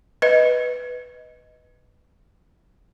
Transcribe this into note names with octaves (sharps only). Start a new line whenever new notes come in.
B4 D#5